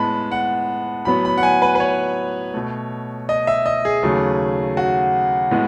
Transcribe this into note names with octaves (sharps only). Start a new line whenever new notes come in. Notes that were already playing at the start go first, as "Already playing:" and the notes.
Already playing: A2 G#3 B3 A5 B5
F#5
A2 F#3 B3 B5
B5
F#5
G#5
B4
B4
C#5
B2 A3
D#5
E5
D#5
G#4
D#2 C#3 F#3 A3
F#4
A2 G#3 B3